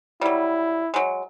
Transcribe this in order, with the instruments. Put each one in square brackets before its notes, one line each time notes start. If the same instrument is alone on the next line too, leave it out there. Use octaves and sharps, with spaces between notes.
[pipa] F#3 G3 [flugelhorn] E4
[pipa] F#3 G#3